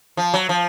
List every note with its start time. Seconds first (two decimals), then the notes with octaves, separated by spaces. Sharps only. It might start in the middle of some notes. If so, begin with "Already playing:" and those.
0.17 F3
0.34 F#3
0.49 F3